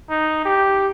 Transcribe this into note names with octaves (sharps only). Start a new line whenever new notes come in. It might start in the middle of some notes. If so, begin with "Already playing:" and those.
D#4
G4